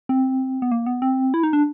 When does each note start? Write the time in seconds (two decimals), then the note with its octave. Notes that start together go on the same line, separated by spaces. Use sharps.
0.09 C4
0.62 B3
0.72 A#3
0.86 B3
1.02 C4
1.34 E4
1.43 D#4
1.53 D4